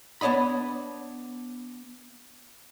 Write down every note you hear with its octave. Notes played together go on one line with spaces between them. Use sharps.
B3 D4 C#5 D#5 B5